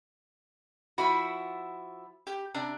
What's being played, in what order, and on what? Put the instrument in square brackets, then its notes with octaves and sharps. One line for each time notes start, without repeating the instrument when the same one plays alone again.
[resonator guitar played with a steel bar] F3 E4 F#4 [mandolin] B5
[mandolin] G4
[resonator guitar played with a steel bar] C3 [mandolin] D4